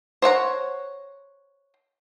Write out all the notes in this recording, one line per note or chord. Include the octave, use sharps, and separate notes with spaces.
C5 C#5 F#5 A#5